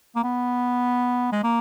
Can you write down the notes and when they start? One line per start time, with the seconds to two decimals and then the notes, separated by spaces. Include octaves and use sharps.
0.16 A#3
0.24 B3
1.32 G#3
1.43 A#3